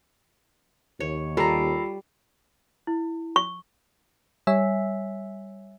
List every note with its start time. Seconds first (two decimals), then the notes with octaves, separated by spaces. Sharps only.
1.00 D#2 C#5
1.37 G3 F4 A4 A#5 B5 C7
2.87 E4
3.36 C#6
4.47 G3 C#5 E5 G#5 E6 B6